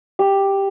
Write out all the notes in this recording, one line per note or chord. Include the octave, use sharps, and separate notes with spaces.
G4